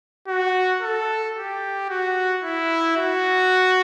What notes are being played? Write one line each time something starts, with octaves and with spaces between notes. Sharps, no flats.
F#4
A4
G4
F#4
E4
F#4